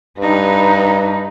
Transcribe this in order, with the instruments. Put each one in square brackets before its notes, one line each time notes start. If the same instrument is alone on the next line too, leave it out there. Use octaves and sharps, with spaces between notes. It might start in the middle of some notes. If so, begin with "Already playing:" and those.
[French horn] G2 [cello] D#4 B4